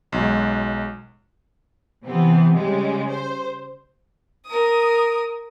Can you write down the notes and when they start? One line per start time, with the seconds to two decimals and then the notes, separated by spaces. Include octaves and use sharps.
0.12 B1 F#3 G#3
2.05 C3 E3 B3 C4
2.55 C#3 G3 G#3
3.10 C5
4.46 A#4 D#6